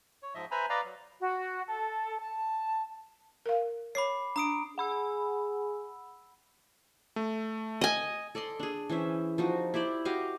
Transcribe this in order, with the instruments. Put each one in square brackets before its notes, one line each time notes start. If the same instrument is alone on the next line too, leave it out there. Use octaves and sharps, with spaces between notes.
[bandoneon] C#5
G#2 F3 D#5 E5
B4 C5 E5 G#5 A#5 B5
B4 D5 D#5 F5 A#5
F#3
[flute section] F#4
A4
A5
[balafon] A#4 F5
[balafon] C#5 [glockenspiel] B5 D6 C7
[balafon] D4 [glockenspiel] A#5 D#6 D7
[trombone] G#4 [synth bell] F#5 B5 E6
[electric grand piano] A3
[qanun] D#5 G#5
A4 D5 D#5 C6
D4 G#4
E3 C#4 C5 E5
F3 D#4 F#4
E4 G4 C5 D5
F#4 G4 D#5 F5